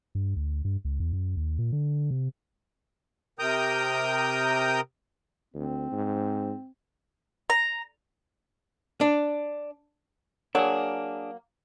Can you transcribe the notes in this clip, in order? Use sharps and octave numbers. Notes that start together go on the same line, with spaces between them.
G2
D2
G2
C#2
E2
F#2
D#2
A#2
D3
C3
C3 A#4 G5 A#5 D#6 G6
D2 C4
G#2
A#5
D4
F#3 A#3 D4 G#4